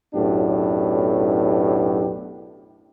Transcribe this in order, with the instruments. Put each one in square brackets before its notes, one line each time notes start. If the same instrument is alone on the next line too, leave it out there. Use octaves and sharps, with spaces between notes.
[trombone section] B1 F#2 A2 B3 D4 G4